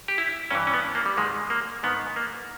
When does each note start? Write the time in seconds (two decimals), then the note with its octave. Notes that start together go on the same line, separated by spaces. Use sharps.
0.08 G4
0.18 E4
0.51 G2 E3 C#4
0.67 C#4
0.74 B3
0.95 A#3
1.06 G3
1.17 G#2 D#3 G#3
1.50 A#3
1.83 G#2 D#3 B3
2.16 A#3